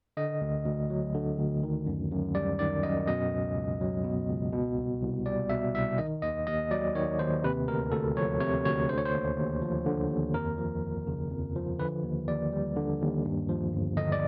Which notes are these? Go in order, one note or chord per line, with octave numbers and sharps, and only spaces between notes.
D3 D#5
D2
D2
F#3
D3
D2
D#3
F#2
F#2
G3 D5
D#3 D5
F#2 D#5
B2 D#5
C#2
C#2
F#3
B2
C#2
B2
C2
C2
G3 D5
B2 E5
C2 E5
D#3 D#5
D#2 D#5
D#2 D#5
F#3 D5
D#3 C#5
D#2 C5
C3 B4
D2 A#4
D2 A4
F3 C#5
C3 C#5
D2 C#5
D3 C5
C#5
C5
D#2
D#2
F3
D3
D#2
F2 A#4
F3
G1
C#3
F2
F3
D3 B4
D#2
D#2 D5
G3
D3
D#2
G2
F3
G1
D3 D#5
D5